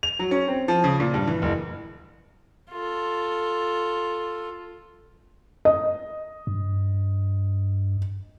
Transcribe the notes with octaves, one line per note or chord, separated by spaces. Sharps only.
F7
F#3
C#4
C4
F3
C#3
A#2
G2
E3
F#1
F4 A4
D#5
G2